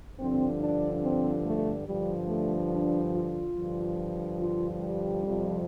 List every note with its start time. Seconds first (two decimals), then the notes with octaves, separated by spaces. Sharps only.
0.20 G2 D3 F3 C4
0.61 D4
1.04 C4
1.45 A3
1.87 G2 D3 F3 G3
2.29 A3
2.72 D4
3.13 F4
3.56 G2 D3 F3
4.40 F4
4.81 G3
5.23 F2 C3 F3